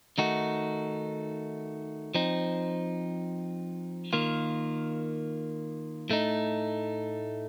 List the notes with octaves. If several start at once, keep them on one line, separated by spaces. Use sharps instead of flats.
D#3 A3 D#4 F#4
F3 C4 D#4
D#3 A#3 F4
A2 A3 D#4